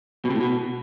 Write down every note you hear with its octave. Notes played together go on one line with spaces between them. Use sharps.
B2
C3
A2
B2